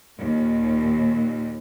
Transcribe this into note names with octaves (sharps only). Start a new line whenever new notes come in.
D#2 A#2